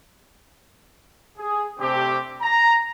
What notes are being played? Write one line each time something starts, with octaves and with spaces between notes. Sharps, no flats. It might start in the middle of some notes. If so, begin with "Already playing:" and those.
G#4
C3 A3 C4 D4 G4
A#5